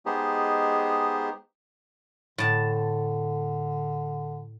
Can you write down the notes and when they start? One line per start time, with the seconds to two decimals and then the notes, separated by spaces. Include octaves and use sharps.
0.06 G#3 B3 D#4 G4 G#4 C5
2.38 A2 D3 A5